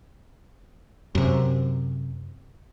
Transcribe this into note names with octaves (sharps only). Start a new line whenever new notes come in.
F#2 C3